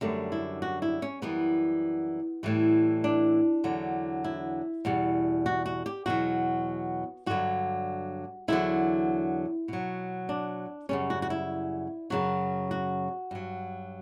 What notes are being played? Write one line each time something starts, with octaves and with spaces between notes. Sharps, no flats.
F#2 D3 G3 A3
E4
F#4
E4
C#4
F#2 E3 G3 B3
A2 E3 G3
D4
E2 D3 F#3
E4
E2 B2 G3
F#4
F#4
G4
E2 B2 F#3 F#4
G2 D3 F#3 F#4
E2 D3 F#3 E4
B2 F#3
D4
F#2 C#3 G3 C#4
F#4
F#4
E4
F#2 C#3 F#3 F#4
F#4
G2 F#3